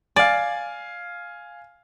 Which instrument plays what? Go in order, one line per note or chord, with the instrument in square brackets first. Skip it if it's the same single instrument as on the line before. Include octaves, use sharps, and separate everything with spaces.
[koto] D5 [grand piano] F5 G#5